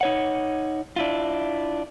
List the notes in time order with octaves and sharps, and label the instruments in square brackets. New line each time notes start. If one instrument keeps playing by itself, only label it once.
[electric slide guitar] D#4 C#5 F#5
D4 E4 F4